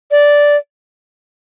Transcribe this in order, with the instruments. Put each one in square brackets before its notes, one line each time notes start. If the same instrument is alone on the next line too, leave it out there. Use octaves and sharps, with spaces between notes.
[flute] D5